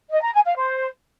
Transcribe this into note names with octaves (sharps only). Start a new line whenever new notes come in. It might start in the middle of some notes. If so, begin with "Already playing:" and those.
D#5
A#5
G#5
F5
C5